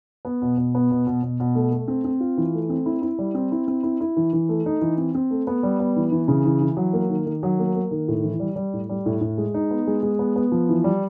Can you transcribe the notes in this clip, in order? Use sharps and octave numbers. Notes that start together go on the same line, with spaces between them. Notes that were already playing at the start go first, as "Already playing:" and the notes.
B3
B2
B2
B3
B2
B2
B2
B2
A3
A3
C4
C4
F4
E3
A3
C4
E4
E4
G3
C4
E4
C4
E4
E4
E3
E3
A3
D#4
E3
C4
C4
A3
B3
G3
B3
E3
E3
C#3
E3
E3
F#3
A#3
D#3
D#3
F#3
A#3
A#3
D#3
A2
E3
G3
G3
A2
G3
A2
A2
G#3
D#4
B3
G#3
G#3
B3
B3
F3
E3
G3